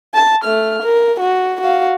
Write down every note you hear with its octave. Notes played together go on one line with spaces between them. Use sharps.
A5
A3 F6
A#4
F#4
F#4 F5